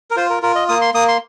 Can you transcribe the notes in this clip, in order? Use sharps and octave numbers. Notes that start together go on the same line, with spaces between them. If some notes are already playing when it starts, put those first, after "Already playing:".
A#4
F4 C5
A#4
F4 A#4
D#5
A#3 D#6
C6
A#3 D#6
C6